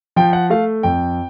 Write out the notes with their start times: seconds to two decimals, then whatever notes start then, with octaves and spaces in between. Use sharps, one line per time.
0.16 F3 G5
0.33 F#5
0.50 A3 F5
0.83 F2 G5